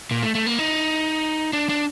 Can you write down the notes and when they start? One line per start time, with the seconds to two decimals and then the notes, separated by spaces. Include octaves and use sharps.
0.11 A#2
0.23 A3
0.35 A3
0.46 A#3
0.59 D#4
1.53 D4
1.69 D4